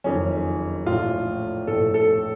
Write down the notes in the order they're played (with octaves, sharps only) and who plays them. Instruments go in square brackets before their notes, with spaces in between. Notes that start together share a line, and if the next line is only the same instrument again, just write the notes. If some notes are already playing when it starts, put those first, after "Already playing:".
[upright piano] F#1 F2 D#3 C#4
A#1 A2 A3 F4
A#1 A2 A3 A4
A4